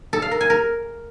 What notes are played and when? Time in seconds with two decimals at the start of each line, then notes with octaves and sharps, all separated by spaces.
0.13 A4
0.22 F5
0.31 A#4
0.41 G#5
0.50 A#4